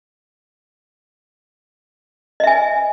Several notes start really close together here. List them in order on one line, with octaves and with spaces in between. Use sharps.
D#5 E5 G#5